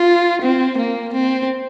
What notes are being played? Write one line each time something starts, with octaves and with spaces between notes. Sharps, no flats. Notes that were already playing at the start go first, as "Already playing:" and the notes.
Already playing: F4
C4
A#3
C4